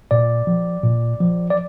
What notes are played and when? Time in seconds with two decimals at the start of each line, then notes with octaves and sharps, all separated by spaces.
0.11 A#2 D5
0.47 F3
0.83 A#2
1.20 F3
1.50 D5